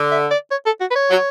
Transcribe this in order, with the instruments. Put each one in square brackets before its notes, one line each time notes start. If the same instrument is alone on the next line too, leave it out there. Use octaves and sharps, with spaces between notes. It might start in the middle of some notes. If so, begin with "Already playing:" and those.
Already playing: [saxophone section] D3
[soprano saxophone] E5
D5
C#5
A4
F#4
B4
C#5
[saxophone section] F#3